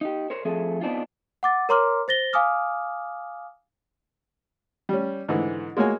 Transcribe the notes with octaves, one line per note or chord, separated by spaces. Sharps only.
D#4 G4
A#4 C5 C#5
F3 A3 C4 G#4 A4
B3 C4 D4 D#4 F4
F#5 D6 A6
A#4 C#5 A#5 C6 D6 F6
C5 A6 A#6 G7
F5 G#5 D6 D#6 F6
G3 C#4
G#2 D3 E3
G#3 A#3 F#4 C#5 G#5